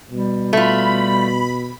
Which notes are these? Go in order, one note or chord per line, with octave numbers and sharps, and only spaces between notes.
B2 G3
A3 F4 B5